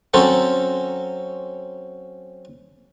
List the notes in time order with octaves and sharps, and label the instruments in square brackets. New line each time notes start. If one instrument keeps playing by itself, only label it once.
[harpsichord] F#3 C4 C#4 A4